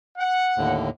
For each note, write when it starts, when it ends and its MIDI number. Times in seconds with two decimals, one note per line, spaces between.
0.18 0.80 78
0.57 0.90 39
0.57 0.90 45
0.57 0.90 50